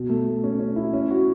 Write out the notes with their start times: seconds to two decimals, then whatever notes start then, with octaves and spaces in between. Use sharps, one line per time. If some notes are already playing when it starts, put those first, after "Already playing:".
Already playing: B2
0.09 A3
0.27 A3
0.44 C#4
0.60 C#4
0.76 E4
0.94 C#4
1.11 F#4